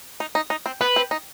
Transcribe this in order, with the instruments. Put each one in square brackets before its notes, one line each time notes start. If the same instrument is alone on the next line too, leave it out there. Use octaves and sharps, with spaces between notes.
[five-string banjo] D#4
D#4
D#4
C4
[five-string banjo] B3 [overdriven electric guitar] B4
[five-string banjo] C4
D#4